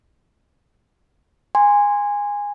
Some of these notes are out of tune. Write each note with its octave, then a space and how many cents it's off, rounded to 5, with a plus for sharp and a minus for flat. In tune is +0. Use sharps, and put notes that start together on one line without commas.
G#5 -15 C6 -5